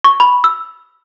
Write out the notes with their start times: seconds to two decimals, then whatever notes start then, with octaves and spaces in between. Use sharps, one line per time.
0.04 C#6
0.20 B5
0.44 E6